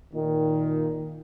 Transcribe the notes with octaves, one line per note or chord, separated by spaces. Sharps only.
A#2 D#3